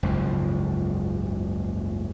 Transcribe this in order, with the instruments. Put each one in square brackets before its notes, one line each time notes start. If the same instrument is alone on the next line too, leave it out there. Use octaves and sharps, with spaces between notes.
[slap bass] F#1 C#2 G#2 F3